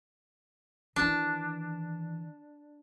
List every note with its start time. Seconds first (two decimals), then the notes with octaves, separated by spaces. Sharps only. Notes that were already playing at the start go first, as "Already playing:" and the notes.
0.96 D#3 E3 D4